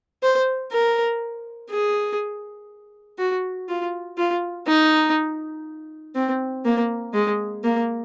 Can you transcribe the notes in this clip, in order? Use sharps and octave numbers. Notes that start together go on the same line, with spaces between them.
C5
A#4
G#4
F#4
F4
F4
D#4
C4
A#3
G#3
A#3